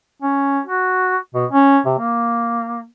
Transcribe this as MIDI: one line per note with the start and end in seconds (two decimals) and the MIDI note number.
0.22 0.61 61
0.67 1.17 66
1.35 1.46 47
1.53 1.80 61
1.86 1.94 48
1.99 2.85 58